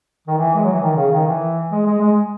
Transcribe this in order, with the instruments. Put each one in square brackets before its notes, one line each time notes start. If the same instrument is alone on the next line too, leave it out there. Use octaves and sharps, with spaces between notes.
[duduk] D#3
E3
G#3
F#3
E3
D#3
C#3
D#3
E3
G#3
G#3
G#3